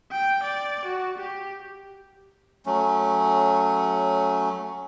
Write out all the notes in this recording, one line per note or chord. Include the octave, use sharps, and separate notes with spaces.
G5
D5
F#4
G4
F#3 A3 C#4